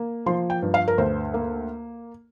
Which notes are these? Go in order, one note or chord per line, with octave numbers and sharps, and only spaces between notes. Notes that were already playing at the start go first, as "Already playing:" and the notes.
Already playing: A#3
F3 C6
G5
G2
F5
A#4
D2 C5
A#3